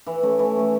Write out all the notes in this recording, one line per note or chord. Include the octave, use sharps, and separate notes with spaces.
E3
A3 C#4
E3
A3 C#4